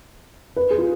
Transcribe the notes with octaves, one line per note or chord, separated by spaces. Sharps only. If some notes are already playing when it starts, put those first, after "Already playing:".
B4
G#4
F4